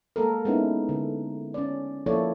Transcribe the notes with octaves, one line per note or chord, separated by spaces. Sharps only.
G#3 A#3 A4 A#4
G#3 B3 C#4 D#4 E4
D3
C#4 D5
F3 A#3 E4 A4 C#5 D5